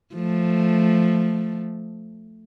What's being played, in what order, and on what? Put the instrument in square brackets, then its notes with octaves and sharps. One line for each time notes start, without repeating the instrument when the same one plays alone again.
[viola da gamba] F3 A3